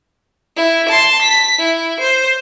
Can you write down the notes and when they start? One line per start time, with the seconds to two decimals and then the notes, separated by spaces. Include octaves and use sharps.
0.57 E4
0.89 A5 C6
1.22 B6
1.59 E4
2.00 C5